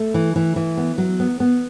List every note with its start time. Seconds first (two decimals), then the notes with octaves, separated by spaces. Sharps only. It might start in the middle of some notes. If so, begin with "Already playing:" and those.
Already playing: A3
0.14 E3
0.36 E3
0.56 E3
0.77 B3
0.98 F#3
1.20 B3
1.40 B3